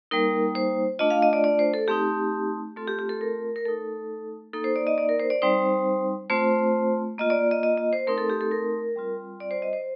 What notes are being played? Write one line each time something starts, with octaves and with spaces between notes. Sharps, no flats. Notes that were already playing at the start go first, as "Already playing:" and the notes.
G3 A#3 D#4 A#4
C5
A3 D4 F4 D#5
F5
D#5
D5
D5
C5
A4
A3 C4 D#4 G4
A3 C4 F4 A4
G4
G4
A4
A#4
A#4
A3 D#4 A4
A#3 D#4 A4
C5
D5
D#5
D5
A#4
C5
D5
G3 C4 D#4 C5
A3 C4 F4 C5
A#3 F4 D#5
D5
D#5
D#5
D#5
C5
A3 C4 D#4 A#4
A4
G4
A4
A#4
G3 C4 F4
D5
C5
D#5
C5